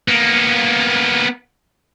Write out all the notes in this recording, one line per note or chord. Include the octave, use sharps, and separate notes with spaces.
A#3 B3